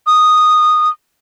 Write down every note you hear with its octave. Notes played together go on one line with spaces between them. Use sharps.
D#6